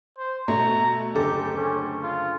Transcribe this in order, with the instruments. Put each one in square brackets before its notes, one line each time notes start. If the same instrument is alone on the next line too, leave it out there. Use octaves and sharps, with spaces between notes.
[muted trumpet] C5
[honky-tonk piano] B2 A3 [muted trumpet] A#5
[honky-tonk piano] F#1 D2 A4 [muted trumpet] G4
[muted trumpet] C#4
F4